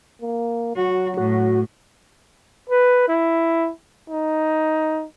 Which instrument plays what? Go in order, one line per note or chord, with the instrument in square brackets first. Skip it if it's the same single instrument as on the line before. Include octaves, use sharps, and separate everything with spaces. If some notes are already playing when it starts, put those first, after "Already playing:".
[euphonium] A#3
[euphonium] F#3 [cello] F#4
[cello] A2 [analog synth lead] F#4
[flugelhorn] B4
E4
D#4